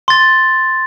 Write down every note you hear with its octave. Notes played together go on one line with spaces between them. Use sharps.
C6 A6